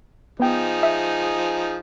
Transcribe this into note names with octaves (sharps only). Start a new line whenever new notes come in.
F3 B3 D#4 G#4 G5
E5